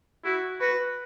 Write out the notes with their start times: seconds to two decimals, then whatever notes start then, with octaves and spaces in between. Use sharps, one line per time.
0.25 E4 F#4
0.61 F#4 B4